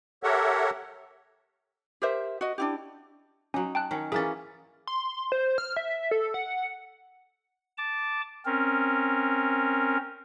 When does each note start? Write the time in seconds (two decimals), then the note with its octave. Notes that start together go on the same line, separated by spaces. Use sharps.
0.23 G4 A4 A#4 C#5 E5 F#5
2.02 G4 A#4 C5 E5
2.41 F#4 D#5
2.58 D4 E4 G4
3.54 F#3 C#4 D#4
3.75 G5 A5 F#6
3.91 D#3 C#4
4.12 E3 A#3 C#4 G#4 A6
4.87 C6
5.32 C5
5.58 F6
5.77 E5
6.11 A4
6.34 F#5
7.78 A5 D6
8.46 C4 C#4 A#4